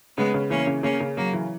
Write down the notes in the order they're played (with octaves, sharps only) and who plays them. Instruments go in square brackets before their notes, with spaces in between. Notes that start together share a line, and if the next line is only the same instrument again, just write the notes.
[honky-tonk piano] C#3 [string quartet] G#3 B3
[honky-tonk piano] C#3
[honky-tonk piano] E3 [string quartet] A#3 C#4
[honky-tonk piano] C#3
[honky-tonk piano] C#3 [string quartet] A#3 C#4
[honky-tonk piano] C#3
[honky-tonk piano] C#3 [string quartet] F#3 A#3
[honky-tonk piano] E3